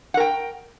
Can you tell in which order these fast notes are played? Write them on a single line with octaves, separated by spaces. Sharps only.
F#5 A#4 G5